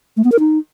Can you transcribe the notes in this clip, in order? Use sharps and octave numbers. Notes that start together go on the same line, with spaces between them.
A3
B3
A#4
D#4